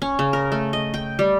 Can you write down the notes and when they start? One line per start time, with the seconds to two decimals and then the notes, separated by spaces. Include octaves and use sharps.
0.02 C#4
0.19 C#3
0.33 A#4
0.52 A3
0.73 D#5
0.94 G5
1.19 G3